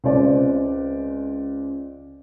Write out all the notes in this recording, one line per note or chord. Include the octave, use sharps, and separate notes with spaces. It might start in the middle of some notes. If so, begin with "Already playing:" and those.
C#2 C4 D5